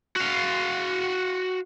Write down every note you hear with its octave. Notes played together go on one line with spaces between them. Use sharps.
F#4 F5